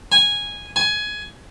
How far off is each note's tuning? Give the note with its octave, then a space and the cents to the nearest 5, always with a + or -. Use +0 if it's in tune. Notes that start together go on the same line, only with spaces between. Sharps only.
G#5 -10
G#5 +15